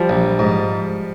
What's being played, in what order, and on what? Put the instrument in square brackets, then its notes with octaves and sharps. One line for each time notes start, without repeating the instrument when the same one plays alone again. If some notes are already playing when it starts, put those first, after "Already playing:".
Already playing: [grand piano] F3 G3
[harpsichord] A#1
G#2